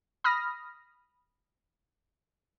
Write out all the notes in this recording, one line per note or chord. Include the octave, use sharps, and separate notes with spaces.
B5 D#6 F6 A#6